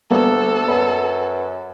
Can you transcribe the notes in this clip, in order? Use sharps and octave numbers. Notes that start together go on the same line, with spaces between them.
D2 G3 A#3 B3 A4
F#2 B4